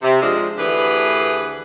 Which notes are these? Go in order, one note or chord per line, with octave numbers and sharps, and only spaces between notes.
C3
F3 G#3 D4
D2 D3 E3 G4 G#4 B4